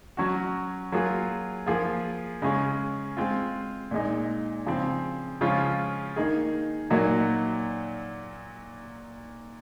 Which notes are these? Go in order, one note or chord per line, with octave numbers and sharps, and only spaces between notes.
F#3 C#4 F#4
F#3 A#3 F4 G#4
F3 A#3 F4 G#4
C#3 G#3 C#4 G#4
G#3 C4 F4
A#2 G#3 D#4
C#3 F3 C4
C#3 F3 G#3 C#4 F4
D#3 A#3 D#4 G#4
A#2 F#3 A#3 D#4 F#4